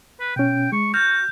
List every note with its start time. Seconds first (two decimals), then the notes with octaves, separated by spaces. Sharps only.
0.20 B4
0.36 B2 C#4 G5
0.72 G#3 C#6
0.94 F#4 F6 G6 G#6